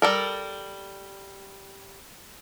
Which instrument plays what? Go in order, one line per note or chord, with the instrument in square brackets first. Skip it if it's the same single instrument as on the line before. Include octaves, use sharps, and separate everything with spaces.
[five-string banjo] G3 A4 A#4